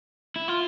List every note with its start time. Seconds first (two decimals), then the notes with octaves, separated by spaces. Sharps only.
0.36 E4
0.48 F4